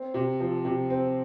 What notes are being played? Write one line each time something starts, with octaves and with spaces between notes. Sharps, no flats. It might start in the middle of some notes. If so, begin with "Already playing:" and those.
Already playing: C4
C3
F3
C3
C4